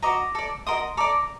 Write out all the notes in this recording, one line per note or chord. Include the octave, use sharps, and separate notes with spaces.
F#4 C5 D#5 A#5 D6
A4 D5
F#4 A#4 D#5 C6 D#6
A4 D5 A#5 D6